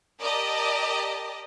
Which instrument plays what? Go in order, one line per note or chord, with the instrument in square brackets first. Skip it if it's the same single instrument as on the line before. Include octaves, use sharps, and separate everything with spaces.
[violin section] G4 A#4 D5 D#5 A5